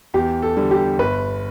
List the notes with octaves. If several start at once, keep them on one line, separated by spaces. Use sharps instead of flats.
E2 G4
A4
D3 G3
G4
G1 B4